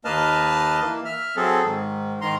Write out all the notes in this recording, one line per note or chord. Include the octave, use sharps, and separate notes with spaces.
D#2 A#3 B4 D#5 A5 F6
E3 A#3
E5 F6
F#3 C4 G#4 A4
G#2 D#3
G#2 D#3 A#5 C6